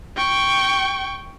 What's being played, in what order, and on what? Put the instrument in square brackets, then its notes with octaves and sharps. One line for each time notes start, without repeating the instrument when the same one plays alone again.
[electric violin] G5 C#6